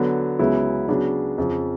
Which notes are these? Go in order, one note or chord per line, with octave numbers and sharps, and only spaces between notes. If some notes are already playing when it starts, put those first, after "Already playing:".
Already playing: D3 F#3 B3
C#2 C#3 F#3 B3 E4
C#3 F#3 B3 D4 F#4
F2 C#3 F3